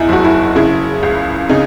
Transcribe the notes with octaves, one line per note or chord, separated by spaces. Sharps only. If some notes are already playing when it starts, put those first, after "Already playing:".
Already playing: E2 D#4 E4
F#1 F#4
E4
C#3 E4
C#2
C#3 D#4